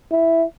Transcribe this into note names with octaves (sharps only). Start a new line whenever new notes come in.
E4